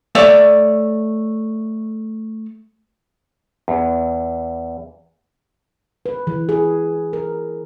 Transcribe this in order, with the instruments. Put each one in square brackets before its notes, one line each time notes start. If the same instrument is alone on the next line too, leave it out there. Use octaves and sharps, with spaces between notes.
[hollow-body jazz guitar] A3 C#5 D5 E5
[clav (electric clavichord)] E2
[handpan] B4
E3
G#4
A#4